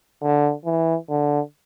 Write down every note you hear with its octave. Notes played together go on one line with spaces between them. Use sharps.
D3
E3
D3